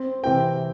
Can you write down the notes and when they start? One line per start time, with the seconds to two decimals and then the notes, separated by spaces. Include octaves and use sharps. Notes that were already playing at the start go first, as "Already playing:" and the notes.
Already playing: C4
0.23 C3 E3 C4 G5